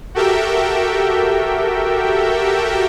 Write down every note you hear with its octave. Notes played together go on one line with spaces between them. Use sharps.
F#4 G4 A4 A#4 E5 G5